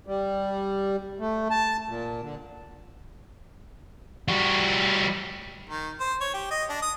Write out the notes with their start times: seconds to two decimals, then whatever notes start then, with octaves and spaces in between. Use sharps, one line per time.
0.07 G3
1.20 A3
1.51 A5
1.89 A#2
2.22 D3
4.28 G3 F#4
5.70 D#3
6.00 C5
6.21 C#5
6.34 G4
6.51 D#5
6.69 D4
6.82 D#6